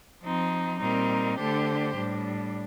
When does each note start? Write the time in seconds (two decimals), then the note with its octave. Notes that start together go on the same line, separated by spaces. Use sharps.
0.22 F3 C4 D#4
0.80 A#2 G3 C4 D#4 A#4
1.38 D3 A3 D4 G4 C5
1.96 A2 G3 D4